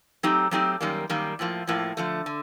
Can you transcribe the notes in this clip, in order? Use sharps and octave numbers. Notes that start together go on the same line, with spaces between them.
F#3 A3 C4 D#4 G4
F#3 A3 C4 D#4 G4
F#2 D#3 G3 A#3
F#2 D#3 G3 A#3
A2 F3 A#3
A2 F3 A#3
D3 F3 A3
D3